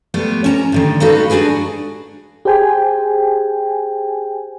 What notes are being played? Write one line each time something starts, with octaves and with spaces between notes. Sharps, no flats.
G3 A3 B3 C5
C#4 A5 A#5
A2 D3 D#3
G3 D#4 F#4 A4 B4 F5
D4 D#4 F#4 G#4 B4
G4 G#4 C5 G5 G#5